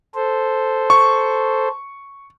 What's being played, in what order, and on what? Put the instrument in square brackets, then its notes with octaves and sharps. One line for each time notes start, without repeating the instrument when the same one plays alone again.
[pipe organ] A4 C5
[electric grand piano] C#6